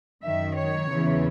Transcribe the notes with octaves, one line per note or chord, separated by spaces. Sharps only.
F#2 D#3 E5
C#5
E2 C#3 E3